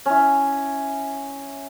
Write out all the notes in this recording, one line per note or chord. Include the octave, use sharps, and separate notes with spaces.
C#4 E4